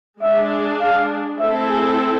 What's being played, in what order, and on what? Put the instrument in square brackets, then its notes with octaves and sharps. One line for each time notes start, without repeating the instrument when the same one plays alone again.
[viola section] G#3 D4 G#4 [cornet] E5
[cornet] F5
[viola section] A3 C4 E4 A4 [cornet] E5
[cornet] G#4